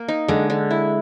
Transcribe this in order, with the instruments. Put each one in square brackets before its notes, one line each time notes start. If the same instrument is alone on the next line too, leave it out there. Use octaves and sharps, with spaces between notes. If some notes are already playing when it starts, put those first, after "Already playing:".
Already playing: [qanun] A#3
D#4
[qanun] D3 [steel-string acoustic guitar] G#3
[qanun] D3
E4